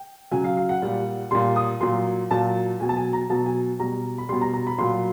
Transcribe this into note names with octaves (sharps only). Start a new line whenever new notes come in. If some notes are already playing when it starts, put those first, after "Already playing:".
Already playing: G5
C#3 F#3 G#5
F5
F5
F#5
A#2 G3
A#2 G3 C6
D#6
A#2 F#3 C6
A#2 F#3 A5
B2 F#3 G#5
A5
G#5
A#5
B2 F#3 A5
G#5
B2 G3 A#5
B5
B2 G3 C6
A#5
A#5
B5
A#2 F#3 C6